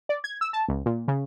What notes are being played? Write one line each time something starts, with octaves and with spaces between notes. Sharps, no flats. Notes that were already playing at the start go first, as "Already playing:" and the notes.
D5
G#6
E6
A5
C#2
A#2
C#3